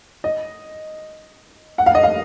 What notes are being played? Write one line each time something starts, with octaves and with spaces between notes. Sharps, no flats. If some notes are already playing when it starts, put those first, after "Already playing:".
D#5
F#5
F5
D#5
F5